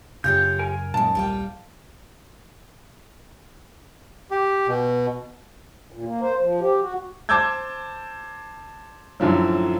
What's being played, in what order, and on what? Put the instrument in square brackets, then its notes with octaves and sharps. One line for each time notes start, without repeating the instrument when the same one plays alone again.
[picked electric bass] F#2 C#3 [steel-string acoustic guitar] F4 G4 C#5 [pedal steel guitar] G6
[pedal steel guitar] A#4 G#5
[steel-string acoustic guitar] F#2 D#3 [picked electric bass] A#2 G#3 [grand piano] A5
[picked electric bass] D1 A#1 [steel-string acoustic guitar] G3 F4 G5
[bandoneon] G4
B2
[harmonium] A#2
A#3
C5
F3
G4
F#4
[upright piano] C5 A5 D6 E6 G6 G#6
F#2 A2 D3 F3 F#3